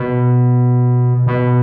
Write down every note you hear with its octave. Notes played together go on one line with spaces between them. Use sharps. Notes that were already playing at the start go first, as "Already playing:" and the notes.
Already playing: B2
B2